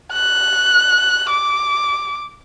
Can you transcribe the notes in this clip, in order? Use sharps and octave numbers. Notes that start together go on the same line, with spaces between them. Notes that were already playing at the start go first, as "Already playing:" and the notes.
F#6
D6